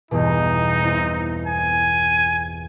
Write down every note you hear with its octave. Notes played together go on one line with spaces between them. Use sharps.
G1 E2 B2 D#4
C4 E4
G#5